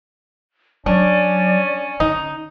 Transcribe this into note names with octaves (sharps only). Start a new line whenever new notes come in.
F#3 C#4 D4 D5
D3 D#4